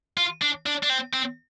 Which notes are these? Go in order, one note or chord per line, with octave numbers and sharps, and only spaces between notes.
F4
D4
D4
D4
C4
C4